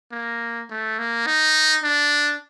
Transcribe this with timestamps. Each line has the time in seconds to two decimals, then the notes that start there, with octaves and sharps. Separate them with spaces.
0.12 A#3
0.70 A3
0.98 A#3
1.26 D#4
1.83 D4